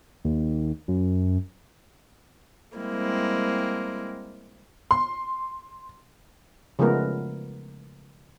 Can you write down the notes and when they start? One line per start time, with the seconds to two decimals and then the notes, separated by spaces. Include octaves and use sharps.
0.25 D#2
0.88 F#2
2.78 G3 G#3 A#3 C4 E4
4.91 C6
6.79 C#3 F3 G#3 A3 B3 A#4